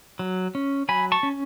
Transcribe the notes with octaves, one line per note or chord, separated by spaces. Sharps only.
F#3
C#4
F#3 G#5 B5
A5 C#6
C#4